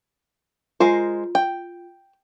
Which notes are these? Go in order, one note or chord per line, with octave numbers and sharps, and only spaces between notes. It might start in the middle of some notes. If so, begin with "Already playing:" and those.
G#3 F4 A#4 C5
G5